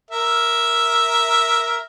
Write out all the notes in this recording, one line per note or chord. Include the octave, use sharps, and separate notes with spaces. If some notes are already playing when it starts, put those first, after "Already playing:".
A#4 E5